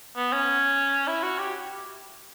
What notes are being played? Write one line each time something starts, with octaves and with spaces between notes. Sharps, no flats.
B3
C#4
E4
F#4
G4